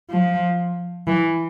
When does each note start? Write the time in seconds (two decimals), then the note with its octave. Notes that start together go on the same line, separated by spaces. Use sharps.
0.10 F3
1.07 E3